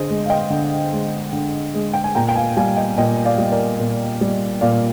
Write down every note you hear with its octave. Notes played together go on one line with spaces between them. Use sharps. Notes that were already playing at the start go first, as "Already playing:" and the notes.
Already playing: D3 G#4 C5 D#5
G#3
F5
D#5 G5
D3
G#3
D3
G#3
G5
G#5
A#2 G5 A#5
G5
F5 G#5
G3 F5 G#5
D#5 G5
A#2 D#5 G5
D5 F5
G3
A#4 D5
A#2
G3
A#2 D5 F5